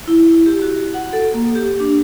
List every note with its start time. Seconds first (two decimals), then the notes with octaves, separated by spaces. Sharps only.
0.08 E4
0.46 G4
0.62 F#4
0.94 F#5
1.13 A4
1.34 A#3
1.55 G4
1.80 D4